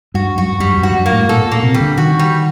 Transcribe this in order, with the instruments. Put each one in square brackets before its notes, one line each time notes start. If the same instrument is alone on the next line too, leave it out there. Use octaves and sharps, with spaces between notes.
[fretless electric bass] G2 [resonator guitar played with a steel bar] F#4
[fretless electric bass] F#2 [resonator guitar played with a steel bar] F#4
[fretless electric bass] G2 [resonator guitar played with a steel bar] G3
[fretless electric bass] F#2
[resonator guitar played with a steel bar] F#4
[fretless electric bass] G2
[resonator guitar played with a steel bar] A#3
[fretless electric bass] A2
[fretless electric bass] A#2 [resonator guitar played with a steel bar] A4
[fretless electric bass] A#2
[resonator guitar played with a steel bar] A#3
[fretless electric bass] C3
[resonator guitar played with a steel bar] G3
[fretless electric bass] D3
[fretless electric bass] D#3 [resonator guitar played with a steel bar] F#4
[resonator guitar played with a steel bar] G3